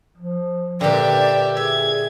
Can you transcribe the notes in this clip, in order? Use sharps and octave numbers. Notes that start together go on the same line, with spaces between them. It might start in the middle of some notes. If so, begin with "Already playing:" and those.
F3
A#2 D3 G4 B4 D5 E5
G#4 E5 G#6